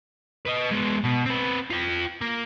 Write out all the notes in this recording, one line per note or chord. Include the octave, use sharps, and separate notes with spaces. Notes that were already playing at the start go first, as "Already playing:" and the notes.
B4 D#5
G#3 B3
B2
C4 B4
F4 G5
A#3